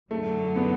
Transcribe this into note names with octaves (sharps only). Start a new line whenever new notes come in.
F#2 D3 F#3 A3
B3